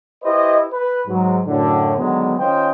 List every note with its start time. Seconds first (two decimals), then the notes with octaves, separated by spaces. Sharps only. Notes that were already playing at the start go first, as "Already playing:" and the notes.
0.24 E4 G4 B4 C5 D#5
0.71 B4
1.07 G#2 F#3
1.46 F#2 A2 D3
1.98 D3 D#3 F#3 G#3 B3
2.38 D#3 C#4 F4 C5 D#5 G5